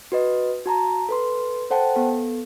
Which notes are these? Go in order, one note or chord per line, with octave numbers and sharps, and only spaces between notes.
F#4 B4 D#5
F#4 A5 A#5
A4 B4 C6
A4 C5 F#5 G5 A5
B3 A4